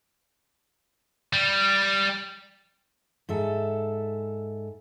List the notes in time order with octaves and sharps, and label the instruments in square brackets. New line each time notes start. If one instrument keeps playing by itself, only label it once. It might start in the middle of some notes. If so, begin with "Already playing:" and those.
[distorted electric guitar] G3
[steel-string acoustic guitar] G#2 A4 E5